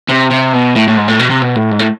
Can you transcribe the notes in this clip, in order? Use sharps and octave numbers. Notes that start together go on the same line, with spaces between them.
C3
C3
B2
A2
A2
G#2
A2
B2
C3
B2
A2
G#2
A2